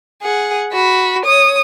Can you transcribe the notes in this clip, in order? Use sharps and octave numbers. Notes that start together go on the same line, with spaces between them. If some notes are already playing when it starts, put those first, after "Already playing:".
G#4 F#5
F#4 B5
C#5 D#6